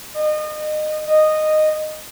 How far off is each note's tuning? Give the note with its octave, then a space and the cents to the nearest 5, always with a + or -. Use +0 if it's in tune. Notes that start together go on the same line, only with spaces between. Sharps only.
D#5 -30
D#5 -10